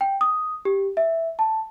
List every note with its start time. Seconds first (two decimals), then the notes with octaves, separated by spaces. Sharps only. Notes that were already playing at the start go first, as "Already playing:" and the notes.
0.01 G5
0.21 D#6
0.65 G4
0.97 E5
1.39 A5